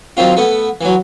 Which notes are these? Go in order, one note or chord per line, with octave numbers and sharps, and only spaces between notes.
D#3 F#3 C4 F4
A3 B3
E3 F#3